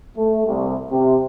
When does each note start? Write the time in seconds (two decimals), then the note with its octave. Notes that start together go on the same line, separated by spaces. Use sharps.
0.17 A3
0.47 C2
0.92 C3